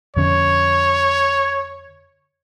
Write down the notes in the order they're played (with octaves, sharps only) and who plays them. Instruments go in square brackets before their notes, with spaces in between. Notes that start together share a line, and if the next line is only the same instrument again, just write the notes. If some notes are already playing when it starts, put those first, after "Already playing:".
[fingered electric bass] F2 D3 C#4 [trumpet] C#5